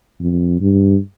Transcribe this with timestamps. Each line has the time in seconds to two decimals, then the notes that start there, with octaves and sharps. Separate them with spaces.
0.20 F2
0.61 G2